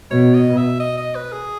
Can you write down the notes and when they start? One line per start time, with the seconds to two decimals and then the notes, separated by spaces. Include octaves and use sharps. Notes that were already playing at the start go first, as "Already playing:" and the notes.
0.11 B2 C#5
0.34 D#5
0.57 E5
0.80 D#5
0.97 D#5
1.15 B4
1.32 G#4